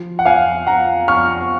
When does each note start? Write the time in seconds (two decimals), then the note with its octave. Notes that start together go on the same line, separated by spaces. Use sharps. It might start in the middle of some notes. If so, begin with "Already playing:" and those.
Already playing: F3
0.19 F#5
0.26 F2 F5 G#5
0.67 F2 F#5 A#5
1.08 F2 C#6 F6